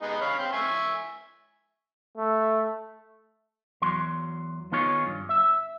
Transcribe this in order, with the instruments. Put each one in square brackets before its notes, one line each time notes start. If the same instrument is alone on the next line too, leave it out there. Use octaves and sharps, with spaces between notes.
[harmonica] G#3 B3 D#4
C#5 F5 B5
C4 C5
E5 G#5 C#6
[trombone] A3
[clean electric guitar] E2 F#3 C6
D#3 B3 D#4 F4 G#4 C#5
G2
E5